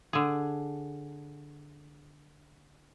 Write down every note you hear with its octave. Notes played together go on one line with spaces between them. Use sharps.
D3 G#4